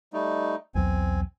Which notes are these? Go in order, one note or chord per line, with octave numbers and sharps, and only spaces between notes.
G3 A3 D#4
B1 E2 F#3 C4 G#5